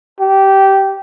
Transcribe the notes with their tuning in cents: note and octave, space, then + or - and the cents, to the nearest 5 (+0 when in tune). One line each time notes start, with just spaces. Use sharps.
G4 -15